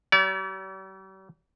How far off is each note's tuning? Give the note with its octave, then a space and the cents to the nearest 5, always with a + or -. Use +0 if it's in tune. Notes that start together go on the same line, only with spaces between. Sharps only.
G3 -45 D5 -45